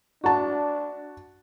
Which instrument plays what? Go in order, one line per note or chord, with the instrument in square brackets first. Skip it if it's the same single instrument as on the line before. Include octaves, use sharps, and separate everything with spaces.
[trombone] D4 [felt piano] F#4 A5